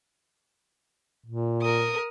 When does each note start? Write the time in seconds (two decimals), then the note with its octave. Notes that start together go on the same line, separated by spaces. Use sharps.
1.26 A#2
1.62 A#4 D#6